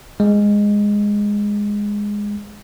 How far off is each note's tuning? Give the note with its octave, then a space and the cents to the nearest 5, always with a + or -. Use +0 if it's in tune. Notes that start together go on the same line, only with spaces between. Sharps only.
G#3 -10